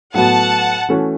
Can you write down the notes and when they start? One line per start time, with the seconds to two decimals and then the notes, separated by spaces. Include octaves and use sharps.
0.14 A2 F#3 B3 F#4 F#5 A5
0.88 E3 A3 C#4 F#4